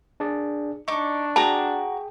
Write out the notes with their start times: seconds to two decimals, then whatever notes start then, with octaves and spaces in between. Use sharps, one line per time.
0.20 D4 G#4 D5
0.88 D4 D#4 C#6 D6
1.36 F#4 G#4 G5 A5 A#5 D6